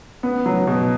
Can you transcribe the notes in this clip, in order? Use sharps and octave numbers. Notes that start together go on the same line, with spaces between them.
B3
F#3
B2